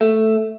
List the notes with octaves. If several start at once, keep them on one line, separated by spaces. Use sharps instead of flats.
A3